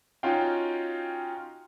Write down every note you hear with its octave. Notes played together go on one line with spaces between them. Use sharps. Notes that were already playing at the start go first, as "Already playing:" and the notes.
C#4 D#4 F4 F#4 F5 G5